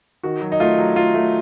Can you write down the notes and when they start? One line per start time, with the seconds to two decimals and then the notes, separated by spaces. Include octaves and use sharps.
0.23 D#3 F#4
0.41 F#3
0.52 D#4
0.60 A3 F4
0.78 F#3
0.96 A3 F4
1.14 A3